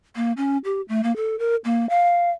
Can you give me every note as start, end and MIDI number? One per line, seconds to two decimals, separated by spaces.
0.16 0.32 58
0.37 0.58 61
0.64 0.81 67
0.89 1.03 57
1.03 1.15 58
1.16 1.38 69
1.39 1.56 70
1.65 1.88 58
1.89 2.30 77